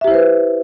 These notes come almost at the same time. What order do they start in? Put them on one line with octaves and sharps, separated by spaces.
E5 G4 E4 C5 B4